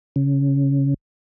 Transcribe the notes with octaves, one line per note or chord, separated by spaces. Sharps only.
C#3